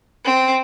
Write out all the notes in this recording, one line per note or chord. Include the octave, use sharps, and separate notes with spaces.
C4